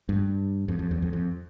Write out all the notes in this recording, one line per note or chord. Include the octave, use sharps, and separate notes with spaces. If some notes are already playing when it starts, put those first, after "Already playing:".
G2
F2
F2
E2
F2
F2